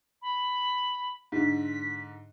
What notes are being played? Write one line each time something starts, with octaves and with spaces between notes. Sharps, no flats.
B5
G#2 D3 B6